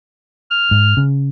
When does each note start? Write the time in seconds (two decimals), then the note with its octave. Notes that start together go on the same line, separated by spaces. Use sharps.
0.51 F6
0.71 G#2
0.97 C#3